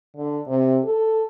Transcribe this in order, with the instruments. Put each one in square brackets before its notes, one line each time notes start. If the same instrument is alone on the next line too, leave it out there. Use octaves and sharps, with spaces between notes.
[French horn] D3
C3
A4